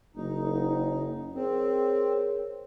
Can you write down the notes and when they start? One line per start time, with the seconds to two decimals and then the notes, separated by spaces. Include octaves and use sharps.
0.16 F#1 D#4
1.35 C4 G#4 A#4 C#5